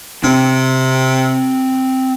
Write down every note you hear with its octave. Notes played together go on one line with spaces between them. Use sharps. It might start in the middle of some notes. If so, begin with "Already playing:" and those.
C3 C4 D4